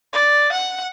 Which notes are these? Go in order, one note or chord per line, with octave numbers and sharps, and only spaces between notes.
D5
F#5